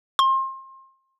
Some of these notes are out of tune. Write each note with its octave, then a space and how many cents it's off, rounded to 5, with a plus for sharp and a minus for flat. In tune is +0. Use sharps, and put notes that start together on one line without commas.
C6 +30